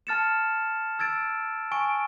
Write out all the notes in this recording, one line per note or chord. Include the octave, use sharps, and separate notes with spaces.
A5 F6 A6 C#7 E7
E6 G#6 A6 D7
G#5 C#6 D7